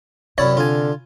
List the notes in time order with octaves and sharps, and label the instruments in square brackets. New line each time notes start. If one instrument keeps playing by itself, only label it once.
[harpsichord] F#2 E4 C#5 [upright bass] C3 [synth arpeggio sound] D5
[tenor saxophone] D3 [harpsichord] F4 G#5